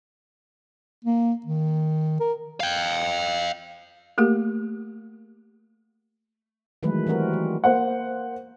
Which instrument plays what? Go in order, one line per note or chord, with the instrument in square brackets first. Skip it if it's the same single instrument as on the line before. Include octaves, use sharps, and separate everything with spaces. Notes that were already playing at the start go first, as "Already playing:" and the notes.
[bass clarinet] A#3
D#3
A#4
[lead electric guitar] F5 G5
[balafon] A3 A#3 G4 G#4 A#4
[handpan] D#3 E3 F#3 G#3 A3 B4
E3 G3 C4 F#4 A#4
E3
[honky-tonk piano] A#3 C5 F#5